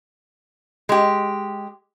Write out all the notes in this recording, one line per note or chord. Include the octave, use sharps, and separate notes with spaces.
G#3 G4